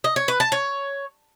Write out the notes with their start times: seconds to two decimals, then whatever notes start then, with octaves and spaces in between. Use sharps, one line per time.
0.04 D#5
0.16 C#5
0.28 B4
0.40 A5
0.52 C#5